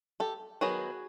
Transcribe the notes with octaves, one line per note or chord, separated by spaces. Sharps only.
G4 A4
D#3 F#3 B3 F#4 G#4